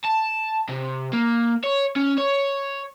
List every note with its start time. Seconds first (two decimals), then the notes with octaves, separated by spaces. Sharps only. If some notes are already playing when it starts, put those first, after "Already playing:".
0.05 A5
0.68 C3
1.13 A#3
1.64 C#5
1.96 C#4
2.18 C#5